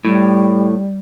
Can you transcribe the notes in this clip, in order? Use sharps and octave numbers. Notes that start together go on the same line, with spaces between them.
A2 G3